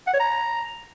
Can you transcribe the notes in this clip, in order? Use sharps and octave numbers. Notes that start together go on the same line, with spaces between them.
F#5
C#5
A#5